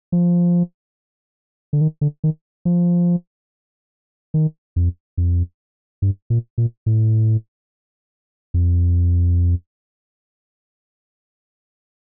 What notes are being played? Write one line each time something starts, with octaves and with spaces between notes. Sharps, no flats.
F3
D3
D#3
D3
D#3
F3
D#3
F2
F2
G2
A#2
A#2
A2
F2